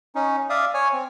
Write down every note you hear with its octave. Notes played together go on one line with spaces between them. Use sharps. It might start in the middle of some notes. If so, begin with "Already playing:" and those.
C#4 D#4
D5 E5 F5 D#6
C#5 G#5
C4